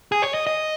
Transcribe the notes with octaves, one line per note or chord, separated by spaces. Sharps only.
G#4
C#5
D#5
D#5